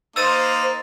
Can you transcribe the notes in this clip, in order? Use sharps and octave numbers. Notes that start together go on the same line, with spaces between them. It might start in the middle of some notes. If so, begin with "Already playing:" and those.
A#3 D#4 C5 C6 E6 A6 D#7